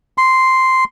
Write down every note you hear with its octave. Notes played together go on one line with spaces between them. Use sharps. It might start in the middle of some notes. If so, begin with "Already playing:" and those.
C6